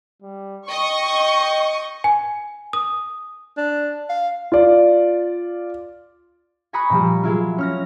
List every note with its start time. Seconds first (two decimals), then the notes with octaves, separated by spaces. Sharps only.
0.22 G3
0.71 D#5 G5 C#6
2.04 G#5
2.73 D#6
3.57 D4
4.09 F5
4.52 F4 D5
6.73 G#5 A#5 B5 C#6 D#6 F#6
6.90 A#2 F3 G3
7.23 F#3 G#3 E4 F4
7.58 C#4 F6 A#6